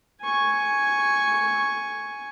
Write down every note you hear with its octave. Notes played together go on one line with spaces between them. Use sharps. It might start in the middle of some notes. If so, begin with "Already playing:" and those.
G#5 C#6